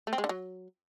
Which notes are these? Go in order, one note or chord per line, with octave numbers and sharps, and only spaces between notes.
A3
C4
G#3
D3
F#3